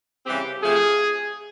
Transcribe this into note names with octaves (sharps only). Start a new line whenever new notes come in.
C#3 E3 G3 C4 G4
C3 F3 A3 G#4